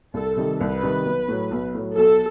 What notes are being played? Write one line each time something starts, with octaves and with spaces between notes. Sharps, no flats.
C2 A4
C3 D#3 G3 D#4
C2 B4
C3 D#3 G3 D#4
B1
A2 F#3
B1
A2 F#3
B1 A4